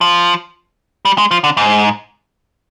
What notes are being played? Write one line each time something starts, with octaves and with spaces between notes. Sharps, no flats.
F3
G3
G#3
F3
D3
G#2